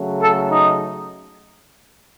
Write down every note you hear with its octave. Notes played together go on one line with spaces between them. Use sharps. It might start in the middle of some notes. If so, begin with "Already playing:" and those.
Already playing: C#3 F#3 A3
A4
D#4